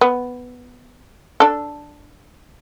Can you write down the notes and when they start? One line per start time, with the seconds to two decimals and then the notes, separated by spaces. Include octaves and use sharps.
0.01 B3
1.40 D4 A4